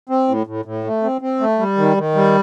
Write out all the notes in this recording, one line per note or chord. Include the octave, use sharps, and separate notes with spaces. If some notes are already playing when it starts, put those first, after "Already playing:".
C4
A2
A2
A2
A3
C4
C4
A3
G3
D#3
D#3
G3